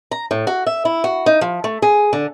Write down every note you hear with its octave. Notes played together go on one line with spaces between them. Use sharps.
A#5
A2
F#4
E5
E4
F#4
D#4
F3
A3
G#4
D3